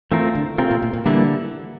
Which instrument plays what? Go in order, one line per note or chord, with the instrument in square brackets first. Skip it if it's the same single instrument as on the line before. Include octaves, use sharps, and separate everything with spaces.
[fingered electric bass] E3 [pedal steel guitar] A3 C4 F4 A#4
[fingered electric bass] D3
[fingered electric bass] C3 [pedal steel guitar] A3 C4 F4 A#4
[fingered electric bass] A#2
A#2
A#2
[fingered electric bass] D3 [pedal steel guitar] E3 G3 A#3 E4